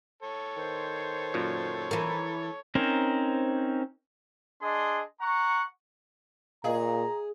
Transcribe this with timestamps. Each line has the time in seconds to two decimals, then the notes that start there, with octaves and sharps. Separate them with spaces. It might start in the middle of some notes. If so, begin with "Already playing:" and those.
0.22 A4 C#5
0.57 D#3 C5
1.34 F#2 A#2
1.91 E3 A#4
2.75 C4 C#4 D#4 A#4 C5
4.62 D4 G#4 D#5 C6
5.21 F#5 A#5 C#6
6.64 A#2 G#4 D#5 F5 A#5